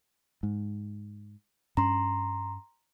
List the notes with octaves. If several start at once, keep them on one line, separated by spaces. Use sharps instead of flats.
G#2
G2 C#4 A#5 C6